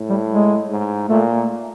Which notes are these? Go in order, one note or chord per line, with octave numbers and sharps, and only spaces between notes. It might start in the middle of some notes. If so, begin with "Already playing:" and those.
Already playing: A2
G3
G#3
G#2
A#2 A3